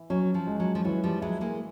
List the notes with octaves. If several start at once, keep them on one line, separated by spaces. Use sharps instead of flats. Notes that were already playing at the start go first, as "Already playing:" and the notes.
Already playing: E3 E4
F#3 C#4
F3
G#3
F#3
F3
E3 F#3
F3 G3
F#3 G#3 E4
G#3 A#3